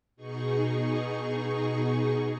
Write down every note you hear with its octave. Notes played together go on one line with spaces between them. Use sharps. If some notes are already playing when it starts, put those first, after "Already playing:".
B2 D#4 G#4 C#6